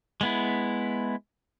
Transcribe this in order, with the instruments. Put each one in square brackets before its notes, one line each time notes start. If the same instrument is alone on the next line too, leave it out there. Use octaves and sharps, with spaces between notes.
[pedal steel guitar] G#3 B3 E4